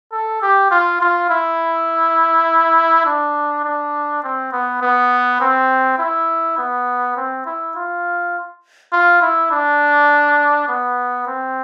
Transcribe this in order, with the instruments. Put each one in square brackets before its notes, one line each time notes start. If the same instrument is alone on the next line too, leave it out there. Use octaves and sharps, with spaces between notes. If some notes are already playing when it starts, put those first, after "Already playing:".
[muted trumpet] A4
G4
F4
F4
E4
D4
D4
C4
B3
B3
C4
E4
B3
C4
E4
F4
F4
E4
D4
B3
C4